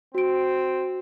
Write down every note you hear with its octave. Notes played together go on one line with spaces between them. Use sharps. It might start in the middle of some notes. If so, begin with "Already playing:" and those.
C4 F#4 D7